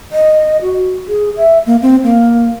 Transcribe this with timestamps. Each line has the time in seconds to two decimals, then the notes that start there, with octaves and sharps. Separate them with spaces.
0.12 D#5
0.62 F#4
1.08 G#4
1.37 E5
1.66 A#3
1.82 C4
2.03 A#3